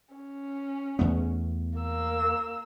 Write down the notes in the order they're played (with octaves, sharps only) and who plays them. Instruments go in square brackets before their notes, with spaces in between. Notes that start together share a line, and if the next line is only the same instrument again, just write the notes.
[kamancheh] C#4
[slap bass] E2 A3 B3
[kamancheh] A#3 E6